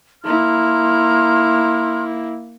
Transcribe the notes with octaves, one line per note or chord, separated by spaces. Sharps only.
A#3 E4 A#5 C6 F6